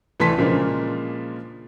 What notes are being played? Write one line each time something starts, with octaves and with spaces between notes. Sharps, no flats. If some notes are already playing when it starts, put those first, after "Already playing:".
C2 E3 A3 A5 C6 B6
A#2 C#3 F3 G#3 A#3 D4